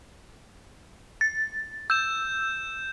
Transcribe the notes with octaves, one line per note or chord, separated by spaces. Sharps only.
A6
E6 G6 E7